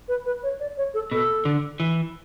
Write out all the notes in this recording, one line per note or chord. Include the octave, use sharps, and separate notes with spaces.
B4
B4
C#5
D5
C#5
A4
B2 A4
D3
E3